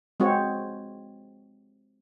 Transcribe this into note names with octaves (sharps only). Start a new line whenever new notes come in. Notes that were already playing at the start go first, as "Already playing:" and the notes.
G#3 C4 F#4 C#5